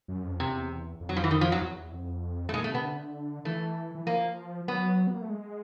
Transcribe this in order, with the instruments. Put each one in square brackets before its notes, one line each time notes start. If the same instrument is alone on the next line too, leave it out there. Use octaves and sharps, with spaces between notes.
[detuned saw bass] F#2
F2
[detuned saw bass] E2 [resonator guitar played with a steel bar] C3
[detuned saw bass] F2
[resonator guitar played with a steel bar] F#3
F3
E3
D#3
F3
F#3
[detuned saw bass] E2
F2
[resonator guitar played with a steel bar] A3
[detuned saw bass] A#2 [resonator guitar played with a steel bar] G#3
[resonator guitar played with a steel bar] A3
[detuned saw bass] C3
[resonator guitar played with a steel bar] B3
[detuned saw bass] D3
[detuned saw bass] E3 [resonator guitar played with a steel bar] A3
[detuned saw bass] E3
[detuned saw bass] F3 [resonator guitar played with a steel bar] A#3
[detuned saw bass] F#3 [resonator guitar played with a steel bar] B3
[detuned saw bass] B3
A#3
A3
G#3